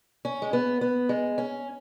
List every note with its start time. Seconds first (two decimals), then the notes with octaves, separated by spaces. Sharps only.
0.25 C#4
0.42 G#3
0.53 B3
0.81 B3
1.09 G#3
1.38 C#4